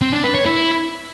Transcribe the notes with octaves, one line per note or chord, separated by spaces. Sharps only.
C4
D4
B4
C#5
E4